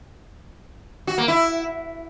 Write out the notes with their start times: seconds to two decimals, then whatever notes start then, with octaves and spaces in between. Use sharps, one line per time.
1.07 F#4
1.18 A#3
1.28 E4